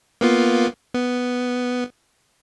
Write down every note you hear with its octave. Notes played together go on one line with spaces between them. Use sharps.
A#3 B3 F4
B3